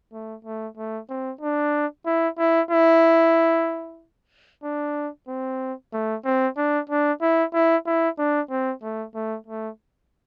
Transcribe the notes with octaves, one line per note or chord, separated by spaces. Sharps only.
A3
A3
A3
C4
D4
E4
E4
E4
D4
C4
A3
C4
D4
D4
E4
E4
E4
D4
C4
A3
A3
A3